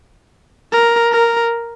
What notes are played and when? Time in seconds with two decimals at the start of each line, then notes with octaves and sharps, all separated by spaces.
0.72 A#4
1.12 A#4